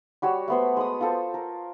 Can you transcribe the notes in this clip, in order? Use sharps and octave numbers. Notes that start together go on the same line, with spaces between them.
G3 F#4 C#5 E6
A3 B3 C5
G#3 B5 D#6
F4 A4 C5
A#4